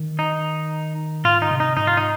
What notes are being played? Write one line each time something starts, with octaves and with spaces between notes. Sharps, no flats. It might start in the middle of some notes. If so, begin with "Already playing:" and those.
Already playing: D#3
D#4
G#2 F4
D#4
C3
D#4
G#2 D#4
F4
D#4